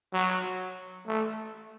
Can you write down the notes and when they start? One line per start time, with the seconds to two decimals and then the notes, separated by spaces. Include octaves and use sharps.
0.14 F#3
1.07 A3